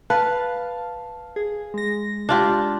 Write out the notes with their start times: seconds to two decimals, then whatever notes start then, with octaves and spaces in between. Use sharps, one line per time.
0.10 B4 F5 A5
1.36 G#4
1.74 G#3 A#6
2.29 D4 F4 G4